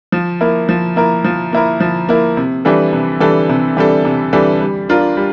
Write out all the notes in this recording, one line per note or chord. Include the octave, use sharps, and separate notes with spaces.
F3
A#3 E4 A#4
F3
A#3 E4 A#4
F3
A#3 E4 A#4
F3
A#3 E4 A#4
C3
E3 G3 D4 A4
C3
E3 G3 D4 A4
C3
E3 G3 D4 A4
C3
E3 G3 D4 A4
G3
D4 F4 A#4
G3